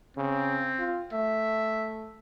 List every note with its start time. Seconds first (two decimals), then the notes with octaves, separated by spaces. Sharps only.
0.17 C#3 C4
0.79 F4
1.12 A3 E5